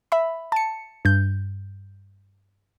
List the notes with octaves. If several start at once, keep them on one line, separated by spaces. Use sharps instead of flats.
E5 B5
A5 C#7
G2 G6